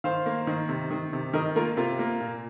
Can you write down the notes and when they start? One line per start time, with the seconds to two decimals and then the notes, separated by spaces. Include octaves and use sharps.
0.04 D#3 C5 F5
0.26 A#3
0.47 D#3
0.69 C3
0.91 D#3
1.13 C3
1.33 D#3 A#4 D#5
1.56 A#3 F4 A#4
1.77 C3 F4 A#4
1.99 A#3
2.21 A#2